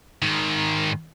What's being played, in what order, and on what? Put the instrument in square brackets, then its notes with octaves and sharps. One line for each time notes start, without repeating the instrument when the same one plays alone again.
[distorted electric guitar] G#2 D#3